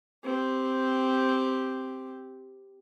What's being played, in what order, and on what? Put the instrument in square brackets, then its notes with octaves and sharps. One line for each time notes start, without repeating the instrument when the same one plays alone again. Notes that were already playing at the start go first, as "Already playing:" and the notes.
[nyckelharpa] C4 G4